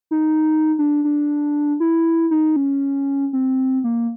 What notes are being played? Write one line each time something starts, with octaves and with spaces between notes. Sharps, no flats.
D#4
D4
D4
E4
D#4
C#4
C4
A#3